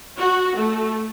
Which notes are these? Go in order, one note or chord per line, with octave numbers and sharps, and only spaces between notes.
F#4
A3